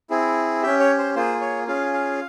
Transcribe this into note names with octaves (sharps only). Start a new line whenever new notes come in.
C4 E4 G#4
C#4 G4 E5
C#5
C5
A#3 F4 G#4 C5
C#5
C#4 F4 G#4 F5
F5